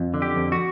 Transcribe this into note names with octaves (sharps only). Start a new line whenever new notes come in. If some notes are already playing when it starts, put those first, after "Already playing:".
Already playing: F2
D3
G4
F2
F#4